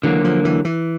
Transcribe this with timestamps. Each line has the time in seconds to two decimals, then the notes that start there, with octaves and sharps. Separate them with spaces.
0.03 D3 E3 F#3 A#3
0.24 F3
0.45 E3
0.65 E3